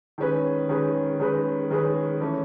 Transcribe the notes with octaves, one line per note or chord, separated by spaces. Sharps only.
D#3 G#3 C#4 G#4 B4
D#3 G#3 C#4 G#4 B4
D#3 G#3 C#4 G#4 B4
D#3 G#3 C#4 G#4 B4
E3 A3 C#4